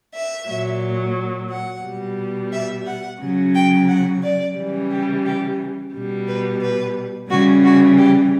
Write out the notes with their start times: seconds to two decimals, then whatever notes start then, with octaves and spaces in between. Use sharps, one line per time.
0.13 E5
0.47 A#2 F#3
1.50 F#5
1.83 B2 G3
2.52 E5
2.86 F#5
3.20 C#3 F#3
3.54 G5
3.88 F#5
4.23 D5
4.56 C#3 E3 G3
4.91 G4
5.25 G4
5.93 B2 G3
6.27 B4
6.61 B4
7.30 C#3 E3 G3 F#4
7.64 F#4
7.98 G4